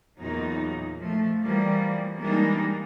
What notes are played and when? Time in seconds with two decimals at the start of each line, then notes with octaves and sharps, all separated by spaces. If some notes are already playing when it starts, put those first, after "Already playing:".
0.17 E2 A#2 F#3 D#4
0.99 F3 A3
1.43 E3 F3 G3 A#3
2.19 E3 G3 G#3 A#3 D4 D#4